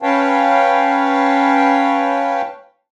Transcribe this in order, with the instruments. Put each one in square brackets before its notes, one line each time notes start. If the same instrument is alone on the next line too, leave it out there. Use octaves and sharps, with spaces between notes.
[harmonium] C#4 B4 C#5 F5 G5 A5